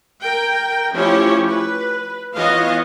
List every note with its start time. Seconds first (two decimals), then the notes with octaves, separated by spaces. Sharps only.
0.20 A#4 G5
0.93 F3 A3 C#4 E4 G4 C#5
1.47 B4
2.35 E3 B3 F4 C#5 D#5 F5